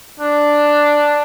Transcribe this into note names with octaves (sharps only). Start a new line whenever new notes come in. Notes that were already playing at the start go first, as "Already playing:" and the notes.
D4